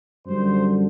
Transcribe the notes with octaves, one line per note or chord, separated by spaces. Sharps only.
F#2 D3 G3 C5